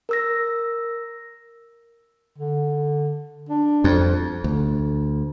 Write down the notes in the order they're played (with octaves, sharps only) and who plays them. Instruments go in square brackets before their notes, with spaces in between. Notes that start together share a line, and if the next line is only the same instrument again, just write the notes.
[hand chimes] A#4 E6 A#6
[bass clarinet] D3
D4
[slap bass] F2
[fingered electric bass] D2